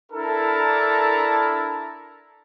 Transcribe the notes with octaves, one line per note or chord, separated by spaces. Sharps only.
D4 E4 A4 A#4 A5 A#5